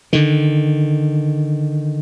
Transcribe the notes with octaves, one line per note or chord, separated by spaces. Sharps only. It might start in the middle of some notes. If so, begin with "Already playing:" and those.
D3 D#3